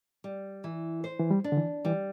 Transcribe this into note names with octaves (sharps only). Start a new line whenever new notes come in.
G3
E3
C5
E3
G3
D4
D3
E3
E3 G3